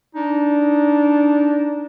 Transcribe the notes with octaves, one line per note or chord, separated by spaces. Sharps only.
D4 D#4